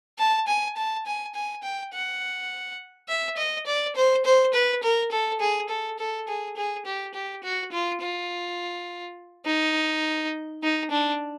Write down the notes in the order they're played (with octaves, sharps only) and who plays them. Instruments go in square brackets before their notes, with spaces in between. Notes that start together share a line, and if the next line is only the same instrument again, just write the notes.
[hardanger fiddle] A5
G#5
A5
G#5
G#5
G5
F#5
E5
D#5
D5
C5
C5
B4
A#4
A4
G#4
A4
A4
G#4
G#4
G4
G4
F#4
F4
F4
D#4
D#4
D4